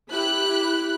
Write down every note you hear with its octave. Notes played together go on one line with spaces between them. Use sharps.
E4 G4 B5 F#6